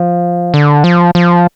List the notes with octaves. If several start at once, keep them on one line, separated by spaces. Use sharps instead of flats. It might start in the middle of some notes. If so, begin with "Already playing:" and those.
Already playing: F3
D3
F3
F3